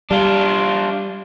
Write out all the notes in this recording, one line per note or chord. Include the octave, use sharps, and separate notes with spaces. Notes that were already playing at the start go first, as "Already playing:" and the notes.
G3 D4 F4